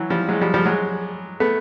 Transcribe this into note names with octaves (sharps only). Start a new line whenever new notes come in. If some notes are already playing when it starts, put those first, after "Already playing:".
Already playing: E3 F#3
F3 G3
F#3 G#3
F3 G3
F3 G3
F#3 G#3
A3 B3